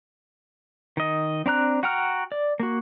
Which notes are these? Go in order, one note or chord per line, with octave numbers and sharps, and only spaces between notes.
D#3 D#5
C4 D4 A#5 F#6
F#4 F#5 G5 A#5 F6
D5
A#3 F#4